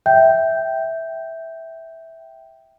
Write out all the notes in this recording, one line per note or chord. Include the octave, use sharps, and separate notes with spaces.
E5 G5 G6